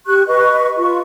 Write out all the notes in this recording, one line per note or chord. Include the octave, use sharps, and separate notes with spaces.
G4 C#6 F#6
B4 D#5 C#6
F4 C#6